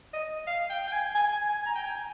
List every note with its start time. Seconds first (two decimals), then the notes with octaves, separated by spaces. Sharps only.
0.13 D#5
0.47 F5
0.70 G5
0.87 G5
0.92 G#5
1.15 G#5
1.32 G#5
1.49 G#5
1.66 A#5
1.76 G5
1.83 G#5